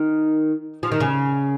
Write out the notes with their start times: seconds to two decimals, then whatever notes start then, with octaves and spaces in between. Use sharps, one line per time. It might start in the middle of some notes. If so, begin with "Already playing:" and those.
Already playing: D#3
0.83 F3
0.92 D#3
1.00 C#3